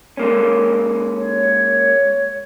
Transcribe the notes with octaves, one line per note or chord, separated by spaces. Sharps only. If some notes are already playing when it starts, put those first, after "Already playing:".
G#3 A#3 C#4
C#5